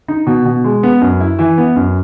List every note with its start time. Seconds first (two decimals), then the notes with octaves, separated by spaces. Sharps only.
0.08 D#4
0.27 B2
0.45 B2
0.64 G#3
0.83 B3
1.01 F#2
1.20 E4
1.39 E3
1.58 B3
1.76 F#2